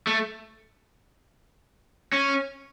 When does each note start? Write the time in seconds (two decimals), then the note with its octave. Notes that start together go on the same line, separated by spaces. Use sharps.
0.07 A3
2.12 C#4